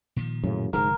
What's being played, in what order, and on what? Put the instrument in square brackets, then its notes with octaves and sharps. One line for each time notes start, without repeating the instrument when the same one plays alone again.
[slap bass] A#2 D#3 F3
[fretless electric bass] F#2 A2 C#3
[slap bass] F1 D3 G#3 [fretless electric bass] G#2 [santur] A#4